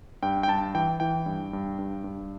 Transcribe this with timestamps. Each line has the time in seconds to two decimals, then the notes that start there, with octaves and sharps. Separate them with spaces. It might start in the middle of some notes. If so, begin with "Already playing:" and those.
0.22 G2 G5
0.43 G5
0.48 G2 A5
0.74 E3 G5
1.00 E3 G5
1.26 G2
1.53 G2
1.78 G2
2.04 G2